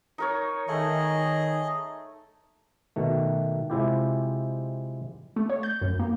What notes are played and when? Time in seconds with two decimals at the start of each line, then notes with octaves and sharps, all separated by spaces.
0.18 D#4 A#4 C#5
0.68 D#3 A3 G#4 D#5
2.96 B2 D#3 A3
3.70 C3 G#3 E4 F4 G4
5.36 A3
5.50 C#5
5.63 G6
5.82 F#2
5.99 A#3